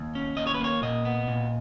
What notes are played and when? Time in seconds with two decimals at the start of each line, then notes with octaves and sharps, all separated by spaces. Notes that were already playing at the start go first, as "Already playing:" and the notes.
Already playing: D#2
0.15 C#4
0.37 D#2 D#5
0.47 C#5
0.54 B4
0.60 A#3 C#5
0.82 A#2 D#5
1.05 B3
1.28 A#2